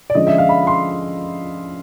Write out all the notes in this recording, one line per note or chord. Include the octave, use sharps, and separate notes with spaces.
D5
D3 F3 G#3 C#4 D#5
E5
F5
B5
C6